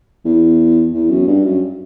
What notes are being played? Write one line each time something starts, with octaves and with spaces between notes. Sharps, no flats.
E2
E2
F#2
G2
F#2